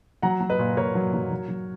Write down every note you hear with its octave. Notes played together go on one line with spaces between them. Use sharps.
F#3 F#5 A#5
F#3
B4 D#5
A#2
A#2 A#4 C#5
F#3
F#3
F#3
F#3